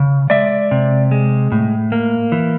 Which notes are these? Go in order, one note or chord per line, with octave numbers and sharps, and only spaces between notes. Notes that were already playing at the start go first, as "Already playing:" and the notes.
Already playing: C#3
G#3 D5 E5
C3
G#3
A2
A#3
E3